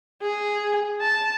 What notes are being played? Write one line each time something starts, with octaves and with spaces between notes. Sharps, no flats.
G#4
A5